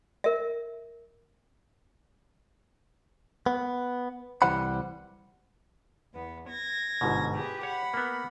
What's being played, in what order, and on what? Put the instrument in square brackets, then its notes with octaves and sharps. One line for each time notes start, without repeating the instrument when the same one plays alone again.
[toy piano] A#4 E5
[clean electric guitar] B3
C2 E3 G3 C5 F#5 B5
[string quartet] E2 B3
G#6 A#6
[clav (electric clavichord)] G1 G#2 B2
[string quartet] G4 G#4 B4
[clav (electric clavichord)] C#5 [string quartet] F#5 B5
[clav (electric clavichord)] A#3 B3